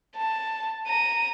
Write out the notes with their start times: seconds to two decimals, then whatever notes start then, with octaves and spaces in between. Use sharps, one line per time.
0.16 A5
0.87 A#5 D#7